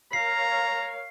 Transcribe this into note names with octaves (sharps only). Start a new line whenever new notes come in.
A#4 C#5 F5 A#5 C7